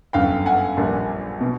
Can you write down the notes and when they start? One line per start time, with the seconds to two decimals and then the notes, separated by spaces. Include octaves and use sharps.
0.13 G1 F#2 D3 F5 G5
0.46 F#5 G#5
0.77 A#1 A#2 G3 A#3 D4
1.41 B2